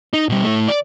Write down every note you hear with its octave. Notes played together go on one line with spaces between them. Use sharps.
D#4
B2 G3
A3 E4
D5